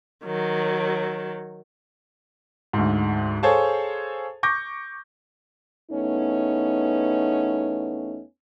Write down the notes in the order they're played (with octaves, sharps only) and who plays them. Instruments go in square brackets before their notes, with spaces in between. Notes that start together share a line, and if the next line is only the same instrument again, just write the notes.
[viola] D#3 F#3
[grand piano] D2 G#2
G#4 A4 C5 C#5 F5 A5
C#6 D6 G6 A#6
[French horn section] E2 A3 B3 C#4 D#4